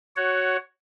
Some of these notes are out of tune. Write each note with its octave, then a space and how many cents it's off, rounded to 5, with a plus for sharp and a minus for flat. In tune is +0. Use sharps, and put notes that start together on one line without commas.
F#4 +5 C#5 +0 F#5 +15